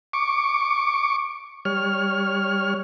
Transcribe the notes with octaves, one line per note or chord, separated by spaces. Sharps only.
C#6 D6
G3 C#5 F6